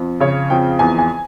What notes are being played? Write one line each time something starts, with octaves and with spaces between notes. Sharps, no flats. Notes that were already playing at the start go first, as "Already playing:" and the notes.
Already playing: F2
C#3 C#5
F2 G5
E2 G#5
G#5